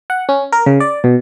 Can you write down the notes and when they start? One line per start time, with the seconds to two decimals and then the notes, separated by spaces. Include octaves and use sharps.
0.10 F#5
0.29 C#4
0.52 A#4
0.66 C#3
0.80 D5
1.04 B2